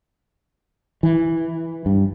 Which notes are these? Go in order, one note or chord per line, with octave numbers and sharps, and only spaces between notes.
E3
G2